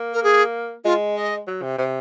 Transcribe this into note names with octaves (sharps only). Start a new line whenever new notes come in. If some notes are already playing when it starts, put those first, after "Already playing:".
Already playing: A#3
A#4
G#4
G#3 F4
D#5
F#3
C3
C3 C5